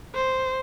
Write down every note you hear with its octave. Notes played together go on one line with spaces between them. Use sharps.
C5